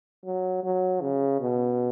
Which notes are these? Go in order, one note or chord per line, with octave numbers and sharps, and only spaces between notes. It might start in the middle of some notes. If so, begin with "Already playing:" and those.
F#3
F#3
C#3
B2